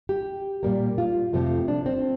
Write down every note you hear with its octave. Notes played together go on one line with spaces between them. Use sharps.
G4
A#2 G3 A#3
F4
F2 C3 F3 A3
D4
C4